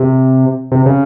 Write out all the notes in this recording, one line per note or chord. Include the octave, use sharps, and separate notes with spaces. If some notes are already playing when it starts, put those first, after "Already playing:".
Already playing: C3
C3
C#3